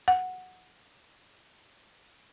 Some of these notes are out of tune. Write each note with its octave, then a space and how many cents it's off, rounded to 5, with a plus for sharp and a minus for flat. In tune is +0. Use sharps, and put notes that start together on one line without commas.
F#5 -5